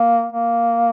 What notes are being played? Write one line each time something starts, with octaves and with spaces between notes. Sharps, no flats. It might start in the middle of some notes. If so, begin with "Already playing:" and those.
Already playing: A#3
A#3